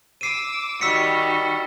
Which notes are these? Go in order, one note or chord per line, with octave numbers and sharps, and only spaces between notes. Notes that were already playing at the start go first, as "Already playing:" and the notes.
D6 E6 C7 D#7
D#3 G3 F#4 E6 B6 C#7